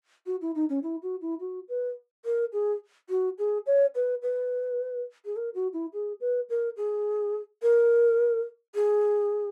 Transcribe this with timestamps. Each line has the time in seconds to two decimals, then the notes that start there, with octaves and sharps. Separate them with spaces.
0.26 F#4
0.42 E4
0.55 D#4
0.70 C#4
0.83 E4
1.03 F#4
1.22 E4
1.40 F#4
1.69 B4
2.25 A#4
2.53 G#4
3.10 F#4
3.39 G#4
3.66 C#5
3.95 B4
4.23 B4
5.25 G#4
5.36 A#4
5.55 F#4
5.73 E4
5.93 G#4
6.21 B4
6.50 A#4
6.77 G#4
7.63 A#4
8.75 G#4